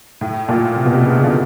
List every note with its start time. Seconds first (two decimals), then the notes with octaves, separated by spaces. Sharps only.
0.21 A2
0.49 A#2
0.76 C3
0.85 B2
0.93 C3
1.04 C#3
1.17 C#3
1.24 D3